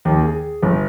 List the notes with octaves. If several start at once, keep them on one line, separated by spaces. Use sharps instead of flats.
D#2
G#4
G1